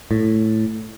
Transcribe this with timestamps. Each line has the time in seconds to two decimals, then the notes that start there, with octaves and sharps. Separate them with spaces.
0.11 A2